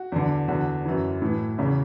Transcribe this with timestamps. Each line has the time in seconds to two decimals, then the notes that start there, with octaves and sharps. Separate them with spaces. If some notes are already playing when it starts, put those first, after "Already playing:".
Already playing: F#4
0.12 E2 D3
0.48 E2 D3 F#4
0.85 F#2 E3
1.22 A2 E3
1.58 E2 C#3 E3